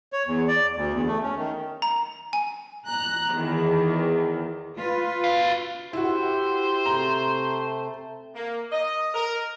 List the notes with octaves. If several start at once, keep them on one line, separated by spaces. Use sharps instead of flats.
C#5
E2
D5
D2
E2
A3
C#4
D#3
A#5
G#5
A#5 F#6
E2 D#3
F4 B4
F#4 F5
E4 F#4 G4 C5
C3 A3 A#5
A#3
D#5
A#4